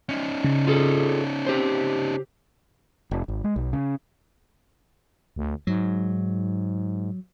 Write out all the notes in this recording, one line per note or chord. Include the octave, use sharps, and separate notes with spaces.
C#4 D#4
C#3
F4 G#4 A4
G4 C5
F1
G#1
G#3
B1
C#3
D2
G#2 F#3